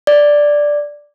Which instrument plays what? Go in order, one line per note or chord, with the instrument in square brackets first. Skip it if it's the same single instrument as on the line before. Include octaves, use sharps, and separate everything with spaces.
[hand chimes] D5